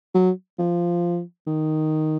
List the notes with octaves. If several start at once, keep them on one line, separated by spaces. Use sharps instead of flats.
F#3
F3
D#3